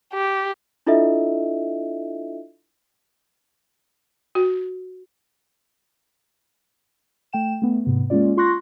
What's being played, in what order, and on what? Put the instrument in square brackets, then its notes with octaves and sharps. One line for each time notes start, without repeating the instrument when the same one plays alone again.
[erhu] G4
[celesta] D4 E4 F4 A4 D#5 E5
[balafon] F#4
[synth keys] A3 G5 E7
A3 B3
G#2 C3 B3
G#3 A#3 C#4 F4 D5
F4 C6 C#6 F#6 A#6